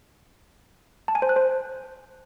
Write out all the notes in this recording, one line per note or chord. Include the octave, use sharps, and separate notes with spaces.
A5
G#5
C5
F#6
C5